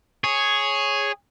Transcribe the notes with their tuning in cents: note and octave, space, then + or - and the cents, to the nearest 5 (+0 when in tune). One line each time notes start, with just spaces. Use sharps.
G#4 +0 C#5 +0